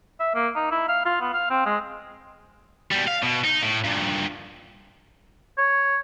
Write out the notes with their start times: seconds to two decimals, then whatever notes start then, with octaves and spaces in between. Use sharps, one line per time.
0.20 E5
0.35 A#3
0.56 D#4
0.72 E4
0.89 F5
1.06 F4
1.21 B3
1.34 F5
1.50 C4
1.66 G#3
2.91 B2 G3
3.07 F5
3.23 B2
3.44 D#4
3.62 A2
3.84 G2 A#2
5.58 C#5